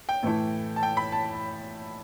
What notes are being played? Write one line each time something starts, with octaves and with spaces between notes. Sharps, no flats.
G5
A2 E3 A3 E4
A5
G5
B5
A5